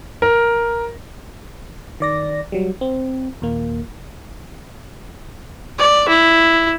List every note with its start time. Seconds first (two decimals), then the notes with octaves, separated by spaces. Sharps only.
0.22 A#4
2.00 D#3 D5 A#6
2.52 F#3 G3
2.81 C4
3.42 D#2 A#2 A#3
5.78 D5
6.08 E4